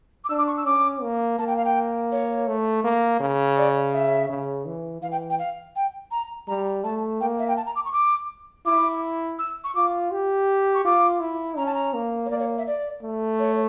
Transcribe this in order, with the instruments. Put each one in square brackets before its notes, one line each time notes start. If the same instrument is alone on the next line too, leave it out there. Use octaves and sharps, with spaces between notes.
[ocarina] D6
[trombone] D4 [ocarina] E6
[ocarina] D6
C#6
E6
[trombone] C#4 [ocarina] D6
[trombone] A#3
[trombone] A#3 [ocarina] A5
[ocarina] G5
F5
G5
C#5
[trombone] A3
A#3
C#3
[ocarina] D5
E5
[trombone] C#3
E3
[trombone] E3 [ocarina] F5
[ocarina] G5
G5
F5
G5
A#5
[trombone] G3 [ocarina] A#5
[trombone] A3 [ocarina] A5
[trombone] A#3 [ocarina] G5
[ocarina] E5
G5
A5
A#5
D6
C#6
D6
[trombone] E4 [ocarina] D6
[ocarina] E6
C#6
[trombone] F4 [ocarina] D6
[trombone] G4
[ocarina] C#6
[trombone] F4 [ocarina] D6
[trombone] E4
[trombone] C#4 [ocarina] A#5
[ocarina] A5
A#5
[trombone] A#3
[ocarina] C#5
[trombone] A#3 [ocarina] D5
[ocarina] C#5
E5
D5
[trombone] A3
[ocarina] C#5